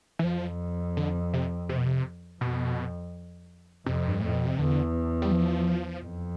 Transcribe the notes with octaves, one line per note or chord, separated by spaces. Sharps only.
E3
F2 F3
D3
C3
C3
B2
C3
F2 B2
F2 C3
G2
F2 A2
B2
C3
E2 D3
G3
F3
F2